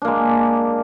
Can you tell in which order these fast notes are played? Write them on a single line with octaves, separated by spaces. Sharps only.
D4 A#3 G#3